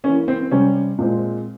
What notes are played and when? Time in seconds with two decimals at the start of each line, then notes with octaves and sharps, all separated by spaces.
0.04 A#3 C#4
0.07 E3
0.28 C4
0.51 C3 G3 C4 C#4
0.98 A#2 G#3 C4